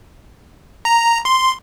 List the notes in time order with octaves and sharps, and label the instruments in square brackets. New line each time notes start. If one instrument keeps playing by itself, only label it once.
[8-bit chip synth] A#5
C6